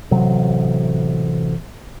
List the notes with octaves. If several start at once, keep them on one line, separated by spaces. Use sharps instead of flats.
A1 C3 F#3